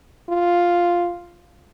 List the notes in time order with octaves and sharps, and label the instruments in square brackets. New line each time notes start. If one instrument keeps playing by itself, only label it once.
[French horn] F4